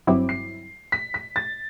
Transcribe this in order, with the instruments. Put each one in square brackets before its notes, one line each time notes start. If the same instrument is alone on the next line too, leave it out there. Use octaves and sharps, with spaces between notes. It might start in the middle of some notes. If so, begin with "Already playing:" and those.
[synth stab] G1 G2 F#3 C4 E4 [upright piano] D6
[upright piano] C7
B6
B6
A6